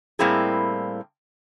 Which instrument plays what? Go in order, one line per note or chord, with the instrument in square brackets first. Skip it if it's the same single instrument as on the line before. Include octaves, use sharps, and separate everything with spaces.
[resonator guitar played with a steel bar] A2 G3 A#3 C4 E4 G#4